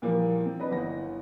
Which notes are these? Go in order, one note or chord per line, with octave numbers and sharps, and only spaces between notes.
A#2 E3 F3 G3 A#3
C4
D4 B4 D#5
G1 E3 F#5 A#6